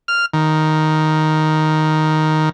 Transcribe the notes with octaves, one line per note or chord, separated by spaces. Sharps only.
F6
D#3